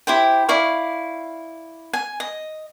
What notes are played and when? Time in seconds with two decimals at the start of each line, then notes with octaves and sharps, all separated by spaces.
0.07 E4 G4 C5 G5
0.49 E4 D5 F5 C#6
1.93 G#5
2.20 D#5